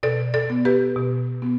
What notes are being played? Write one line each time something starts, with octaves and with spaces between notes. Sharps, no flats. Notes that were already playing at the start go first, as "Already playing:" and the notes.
B2 A4 D5
A4 D5
B3
G4 B4
B2
B3